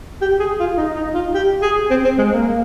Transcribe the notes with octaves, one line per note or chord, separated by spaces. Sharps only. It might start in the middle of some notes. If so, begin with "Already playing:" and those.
G4
G#4
F4
D#4
D#4
F4
G4
G#4
C4
C4
G#3
A#3